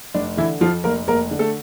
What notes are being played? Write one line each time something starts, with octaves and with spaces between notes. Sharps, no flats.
F1 D4
D3 E3 E4
F2 F3 F4
F1 A#3 A#4
F1 A#3 A#4
D3
A3 A4